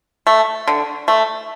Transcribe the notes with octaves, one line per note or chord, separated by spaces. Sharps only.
A3
D3
A3